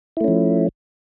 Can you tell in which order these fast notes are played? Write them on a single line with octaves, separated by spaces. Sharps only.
E4 A3 C#4 F3